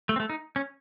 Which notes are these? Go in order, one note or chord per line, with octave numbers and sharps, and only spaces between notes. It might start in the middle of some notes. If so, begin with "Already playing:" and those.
A3
C4
A3
D#4
C#4